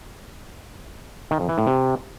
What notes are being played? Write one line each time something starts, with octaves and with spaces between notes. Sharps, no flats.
D#3
F2
E3
A2
C3